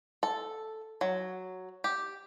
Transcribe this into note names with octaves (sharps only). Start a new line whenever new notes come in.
A4
F#3
G4